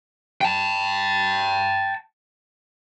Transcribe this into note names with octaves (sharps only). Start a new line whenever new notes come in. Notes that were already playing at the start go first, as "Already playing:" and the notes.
G5 A5